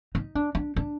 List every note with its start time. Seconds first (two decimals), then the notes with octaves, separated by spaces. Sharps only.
0.15 D#4
0.35 D4
0.55 D4
0.76 D4